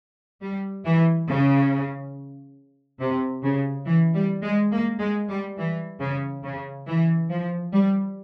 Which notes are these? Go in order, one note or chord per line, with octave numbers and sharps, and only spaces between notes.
G3
E3
C#3
C3
C#3
E3
G3
G#3
A#3
G#3
G3
E3
C#3
C#3
E3
F3
G3